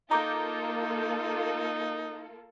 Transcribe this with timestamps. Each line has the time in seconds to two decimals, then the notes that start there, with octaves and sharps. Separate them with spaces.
0.11 A#3 D#4 F4 A4 A#5 D6 G6